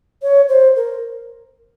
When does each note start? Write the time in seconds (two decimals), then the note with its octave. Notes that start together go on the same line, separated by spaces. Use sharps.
0.22 C#5
0.49 C5
0.76 A#4